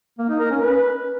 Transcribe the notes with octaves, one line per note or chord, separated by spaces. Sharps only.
A#3
D#4
A#4
C#4
B4